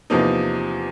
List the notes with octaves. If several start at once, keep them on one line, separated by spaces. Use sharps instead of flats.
E2 C3 F3 A#3 D#4